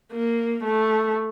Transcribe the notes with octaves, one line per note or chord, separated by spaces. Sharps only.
A#3
A3